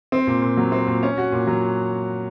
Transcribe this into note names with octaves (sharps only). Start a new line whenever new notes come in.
C4
A#2
A#2
F#3
C4
A#2
C#4
F#4
A#2
F#3